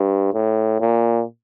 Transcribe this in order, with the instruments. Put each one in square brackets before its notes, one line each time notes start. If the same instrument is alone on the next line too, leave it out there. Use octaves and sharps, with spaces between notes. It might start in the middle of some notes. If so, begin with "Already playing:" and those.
Already playing: [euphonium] G2
A2
A#2